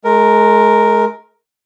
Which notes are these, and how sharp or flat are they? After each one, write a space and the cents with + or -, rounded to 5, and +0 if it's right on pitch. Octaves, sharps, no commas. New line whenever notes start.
G#3 +35 A#4 +0